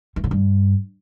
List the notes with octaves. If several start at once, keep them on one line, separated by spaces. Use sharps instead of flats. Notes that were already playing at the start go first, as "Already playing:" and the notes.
E3
D3
G2